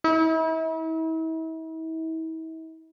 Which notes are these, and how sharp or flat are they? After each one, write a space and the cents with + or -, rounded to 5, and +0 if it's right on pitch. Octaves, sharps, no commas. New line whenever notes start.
E4 -40